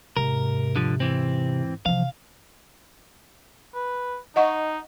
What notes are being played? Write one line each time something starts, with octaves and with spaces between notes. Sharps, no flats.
E2 G#2 C3 A#4
D3 F3
E3 C4
C3 E3 F3 F5
B4
D#4 D#5 F#5 C#6